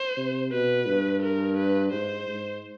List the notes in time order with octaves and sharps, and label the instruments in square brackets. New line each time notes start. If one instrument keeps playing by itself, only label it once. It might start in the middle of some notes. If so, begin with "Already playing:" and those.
Already playing: [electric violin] C5
[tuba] C3
[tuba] B2 [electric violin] B4
[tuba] G2
[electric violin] A#4
B4
[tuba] G#2 [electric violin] C5
[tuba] G#2